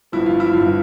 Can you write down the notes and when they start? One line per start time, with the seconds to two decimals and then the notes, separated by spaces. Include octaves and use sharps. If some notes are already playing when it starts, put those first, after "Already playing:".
0.12 G1 G2 F3 E4
0.26 F4
0.40 E4
0.53 G1 G2 F3 F4